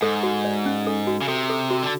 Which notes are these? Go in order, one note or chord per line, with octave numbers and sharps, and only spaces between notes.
G#2 A4
F#4
D5
C#4
A4
F#4
C#3
C3 A4
A4
F#4
D3